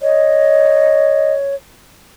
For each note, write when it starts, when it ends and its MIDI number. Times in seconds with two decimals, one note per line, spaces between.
0.01 1.55 73
0.01 1.33 75